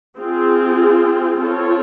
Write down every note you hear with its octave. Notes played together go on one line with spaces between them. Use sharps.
C4 F4 G#4
C4 F4 A4 C#5